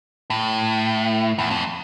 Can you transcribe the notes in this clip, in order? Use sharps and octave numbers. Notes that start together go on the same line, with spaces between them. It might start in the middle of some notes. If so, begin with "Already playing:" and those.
A2
E2
F2